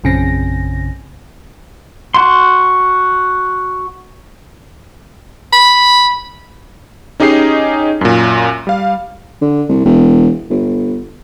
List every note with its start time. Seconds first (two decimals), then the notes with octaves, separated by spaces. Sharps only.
0.04 A#1 F#2 C#3 C4 A#6
2.14 F#4 C6
5.53 B5
7.20 C#4 D#4 G4 G#4 D#5 C7
8.01 F#2 A#2
8.67 G3 F5
9.41 D3
9.69 C2
9.85 E1
10.50 G1